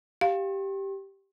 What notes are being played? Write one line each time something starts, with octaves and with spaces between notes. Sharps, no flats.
G4 F5